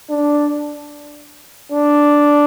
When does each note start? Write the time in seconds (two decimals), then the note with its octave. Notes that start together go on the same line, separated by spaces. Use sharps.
0.10 D4
1.72 D4